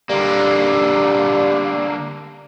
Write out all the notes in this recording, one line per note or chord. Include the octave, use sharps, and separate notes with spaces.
D3 G3 A#3